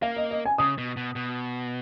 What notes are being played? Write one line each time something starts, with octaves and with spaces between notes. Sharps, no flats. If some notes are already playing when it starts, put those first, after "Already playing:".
A#3 F5
D#5
D#5
G#5
C#3 D#6
B2
B2
B2